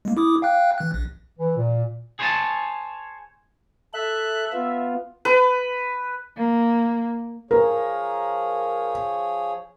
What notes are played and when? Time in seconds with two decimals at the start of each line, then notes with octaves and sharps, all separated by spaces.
0.05 G#3 A#3
0.17 E4 D6 D#6
0.42 F5 G5 F#6
0.78 E3 F#6
0.94 A#1
1.37 E3
1.56 A#2
2.19 G#4 C5 C#5 D#5 G#5 A5
3.94 A4 E5 F#6
4.53 B3 F4
5.25 B4
6.37 A#3
7.51 F3 G#4 A#4 C#5